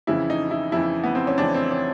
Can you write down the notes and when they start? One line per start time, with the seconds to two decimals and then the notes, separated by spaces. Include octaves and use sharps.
0.07 F2 C#3 E3 E4
0.30 D#4
0.51 E4
0.72 F2 C#3 E3 E4
1.04 B3
1.15 C4
1.27 C#4
1.38 F2 C#3 E3 D4
1.54 C4
1.71 C#4